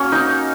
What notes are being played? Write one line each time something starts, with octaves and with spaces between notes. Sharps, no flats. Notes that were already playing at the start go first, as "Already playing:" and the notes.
Already playing: A#3 C#4 F#4 C#5
D#4 D#5